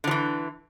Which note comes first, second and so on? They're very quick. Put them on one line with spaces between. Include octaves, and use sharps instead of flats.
D3 F3 E3